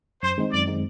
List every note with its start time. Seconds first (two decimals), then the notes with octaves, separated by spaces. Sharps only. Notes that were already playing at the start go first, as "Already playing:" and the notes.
0.22 F#2 C5
0.38 D#3 G#3 C4 D#4
0.53 F#2 D5
0.68 D#3 G#3 C4 D#4